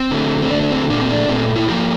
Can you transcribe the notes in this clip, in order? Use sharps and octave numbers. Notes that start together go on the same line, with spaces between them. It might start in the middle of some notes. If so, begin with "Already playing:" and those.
Already playing: C4
D3 A3
C4
D3 A3 D4
D4
C4
A#2 A3 D4
C4
D4
A#2 A3 C4
E4
D3 F3 A#3 G4